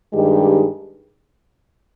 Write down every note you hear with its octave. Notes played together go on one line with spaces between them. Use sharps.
G2 D#3 G#3 D#4 G4